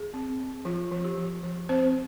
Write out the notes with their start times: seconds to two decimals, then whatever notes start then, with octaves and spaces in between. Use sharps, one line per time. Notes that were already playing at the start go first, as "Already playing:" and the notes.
Already playing: G#4
0.14 C4
0.40 C4
0.65 F3 F4
0.92 F3
1.04 G4
1.17 F3
1.44 F3
1.69 C4 C5